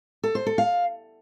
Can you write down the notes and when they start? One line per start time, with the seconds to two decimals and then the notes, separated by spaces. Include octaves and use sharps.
0.24 A4
0.35 C5
0.47 A4
0.58 F5